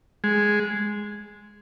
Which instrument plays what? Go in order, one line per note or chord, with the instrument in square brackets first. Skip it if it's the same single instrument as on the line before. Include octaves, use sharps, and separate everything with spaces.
[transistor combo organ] G#3